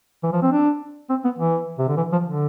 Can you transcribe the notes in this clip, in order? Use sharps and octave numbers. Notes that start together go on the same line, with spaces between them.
E3
F3
C4
D4
C4
B3
E3
C3
D3
E3
F3
D3